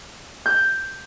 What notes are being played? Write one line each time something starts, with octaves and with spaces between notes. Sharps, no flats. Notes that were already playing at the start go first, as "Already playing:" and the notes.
G6